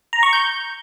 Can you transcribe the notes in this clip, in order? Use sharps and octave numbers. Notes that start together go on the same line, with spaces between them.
A#5
C#6
G6